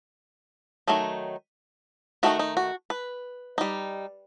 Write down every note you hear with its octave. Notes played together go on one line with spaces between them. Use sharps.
D#3 F#3 A3 D#4
D#3 A3 D#4 F#4
D#4
F#4
B4
G3 D#4